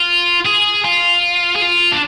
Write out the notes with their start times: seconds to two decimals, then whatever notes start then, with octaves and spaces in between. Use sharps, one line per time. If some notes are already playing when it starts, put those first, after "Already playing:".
Already playing: F4
0.46 G#4
0.85 F4
1.56 G#4
1.62 F4
1.92 D4